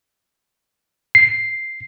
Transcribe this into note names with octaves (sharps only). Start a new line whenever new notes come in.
C7